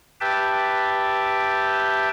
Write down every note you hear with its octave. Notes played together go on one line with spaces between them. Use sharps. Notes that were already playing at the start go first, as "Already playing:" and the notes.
G4 B4 E5 G5 A5